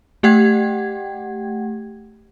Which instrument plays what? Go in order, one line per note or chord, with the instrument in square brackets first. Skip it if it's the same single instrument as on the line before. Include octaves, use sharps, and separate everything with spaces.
[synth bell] A3 G4 F#5 G5 G#6